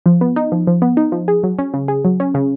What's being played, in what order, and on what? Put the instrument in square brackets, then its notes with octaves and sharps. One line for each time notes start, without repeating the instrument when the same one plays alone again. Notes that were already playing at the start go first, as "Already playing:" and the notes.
[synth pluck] F3
B3
D#4
F3
F3
B3
D#4
F3
G#4
F#3
C#4
C#3
G#4
F#3
C#4
C#3